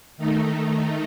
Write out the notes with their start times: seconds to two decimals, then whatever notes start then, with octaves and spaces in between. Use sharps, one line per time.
0.17 D#3 A3 D#4